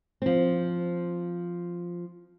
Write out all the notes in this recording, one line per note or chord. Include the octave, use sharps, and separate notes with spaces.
F3 C4